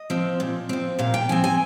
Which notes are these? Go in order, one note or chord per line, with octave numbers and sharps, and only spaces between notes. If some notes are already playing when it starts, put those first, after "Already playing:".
Already playing: D#5
F3 C4
A#2
F3 C4
A#2 F5
G5
F3 C4 G#5
G#5